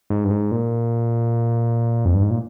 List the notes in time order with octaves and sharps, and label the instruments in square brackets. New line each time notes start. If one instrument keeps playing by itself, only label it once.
[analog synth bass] G#2
G2
G#2
A#2
F2
G2
G#2
A#2